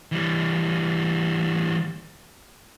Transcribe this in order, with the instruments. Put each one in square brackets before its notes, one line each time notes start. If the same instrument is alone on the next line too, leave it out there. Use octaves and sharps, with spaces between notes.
[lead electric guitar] E3 G3